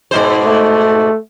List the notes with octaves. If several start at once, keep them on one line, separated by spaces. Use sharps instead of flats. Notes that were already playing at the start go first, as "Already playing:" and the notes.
G#2 B2 C5
A3